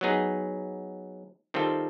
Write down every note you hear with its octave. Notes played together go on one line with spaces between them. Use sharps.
F#3 B3 D#4 G#4
D#3 G3 C4 F4 A4